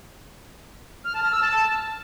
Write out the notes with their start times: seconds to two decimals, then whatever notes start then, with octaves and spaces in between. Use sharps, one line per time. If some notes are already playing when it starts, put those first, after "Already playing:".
1.05 F6
1.14 A5
1.23 F6
1.33 E6
1.42 A5